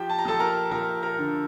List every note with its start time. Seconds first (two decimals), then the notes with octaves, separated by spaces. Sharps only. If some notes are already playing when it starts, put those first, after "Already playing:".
Already playing: F3 G4 G5
0.09 A5
0.18 A#5
0.25 F3 A4 A5
0.40 A#4 A#5
0.71 F3 A#4 A#5
1.03 A#4 A#5
1.18 D3